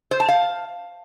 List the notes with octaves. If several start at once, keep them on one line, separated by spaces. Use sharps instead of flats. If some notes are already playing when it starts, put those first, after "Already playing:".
C5
A5
F5